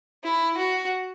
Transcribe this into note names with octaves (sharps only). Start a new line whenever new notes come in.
E4
F#4